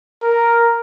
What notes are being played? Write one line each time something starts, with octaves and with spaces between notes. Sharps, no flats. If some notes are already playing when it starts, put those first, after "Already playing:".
A#4